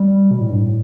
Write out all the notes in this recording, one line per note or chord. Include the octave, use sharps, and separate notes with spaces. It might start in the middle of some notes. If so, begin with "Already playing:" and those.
Already playing: G3
B2
A2
G2
A2